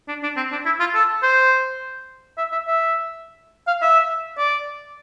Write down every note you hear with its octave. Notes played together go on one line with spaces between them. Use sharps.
D4
D4
C4
D4
E4
F4
A4
C5
E5
E5
E5
F5
E5
D5